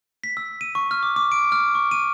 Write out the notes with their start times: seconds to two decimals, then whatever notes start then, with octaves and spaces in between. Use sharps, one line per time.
0.24 B6
0.37 E6
0.61 D#7
0.75 C#6
0.91 F6
1.03 D6
1.16 D6
1.32 D7
1.52 F6
1.75 C#6
1.91 D#7